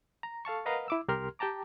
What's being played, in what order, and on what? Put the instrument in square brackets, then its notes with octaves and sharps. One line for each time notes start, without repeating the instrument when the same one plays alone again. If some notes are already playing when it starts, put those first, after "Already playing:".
[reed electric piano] A#5
A4 F5 A5 C#6
A#4 B4 D#5 F5 F#5 A#5
E4 D6 E6
C2 G4 A#4 C6 F6
G4 G5 A5 A#5 D6